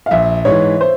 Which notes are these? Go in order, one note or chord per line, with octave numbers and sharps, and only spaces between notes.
F5
A#1 E5
G#2 E3 C#5
C5